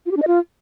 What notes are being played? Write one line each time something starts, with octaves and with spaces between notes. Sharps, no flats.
F4
G4
D4
D#5
F4